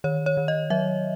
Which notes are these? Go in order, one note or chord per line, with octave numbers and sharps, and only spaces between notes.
D#3 C#5
C#5
D#3
D#5
F#3 E5